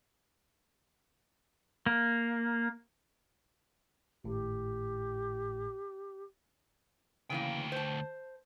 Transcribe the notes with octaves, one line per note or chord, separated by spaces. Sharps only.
A#3
G#1 A2 G4
D2 C#3 E3 A#3 G5
C5 A5